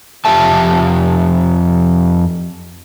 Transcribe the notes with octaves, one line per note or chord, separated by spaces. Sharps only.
F2 F4 G4 E5 A5